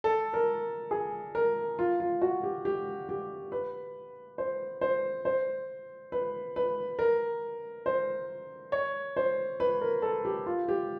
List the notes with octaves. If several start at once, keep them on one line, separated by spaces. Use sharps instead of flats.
A4
A#4
G#4
A#4
F4
F4
F#4
G4
G4
G4
B4
C5
C5
C5
B4
B4
A#4
C5
C#5
C5
B4
A#4
A4
G4
F4
G4